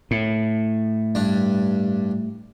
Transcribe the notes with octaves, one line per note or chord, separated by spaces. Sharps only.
A2
G2 D4